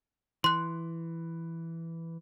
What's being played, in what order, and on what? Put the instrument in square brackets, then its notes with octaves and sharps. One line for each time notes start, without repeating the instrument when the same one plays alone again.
[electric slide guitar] E3 [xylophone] C6 F#6